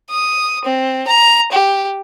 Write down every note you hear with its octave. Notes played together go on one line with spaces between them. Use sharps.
D#6
C4
A#5
G4